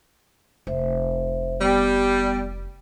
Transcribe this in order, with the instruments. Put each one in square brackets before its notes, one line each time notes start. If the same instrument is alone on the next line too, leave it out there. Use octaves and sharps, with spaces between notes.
[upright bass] F1 [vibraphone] C5 E5
[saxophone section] G3 [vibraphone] B3